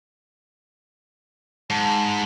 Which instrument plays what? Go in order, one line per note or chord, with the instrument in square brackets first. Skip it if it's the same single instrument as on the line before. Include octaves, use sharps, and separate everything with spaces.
[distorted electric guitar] G#2 [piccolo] A5